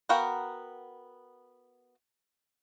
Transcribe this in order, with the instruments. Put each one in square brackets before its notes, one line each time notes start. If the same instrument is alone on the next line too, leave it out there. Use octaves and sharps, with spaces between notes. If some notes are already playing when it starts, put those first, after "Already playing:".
[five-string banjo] B3 F#4 A#4 F5 G5